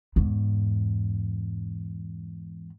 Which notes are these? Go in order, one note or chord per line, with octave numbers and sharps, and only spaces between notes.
E2 G#2